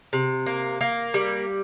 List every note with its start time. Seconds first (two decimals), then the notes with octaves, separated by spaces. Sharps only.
0.13 C3
0.46 A#3
0.81 A#3
1.14 G3